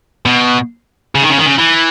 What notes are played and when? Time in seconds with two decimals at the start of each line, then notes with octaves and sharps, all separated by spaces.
0.26 B2
1.15 C#3
1.22 D#3
1.30 C#3
1.38 D#3
1.46 C#3
1.58 E3